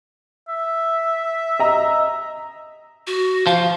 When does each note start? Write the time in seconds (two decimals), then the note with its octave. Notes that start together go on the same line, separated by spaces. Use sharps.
0.48 E5
1.60 D#5 A#5 E6
3.07 F#4
3.47 F3 F5